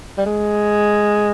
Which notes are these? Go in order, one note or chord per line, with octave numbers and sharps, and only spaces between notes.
G3
G#3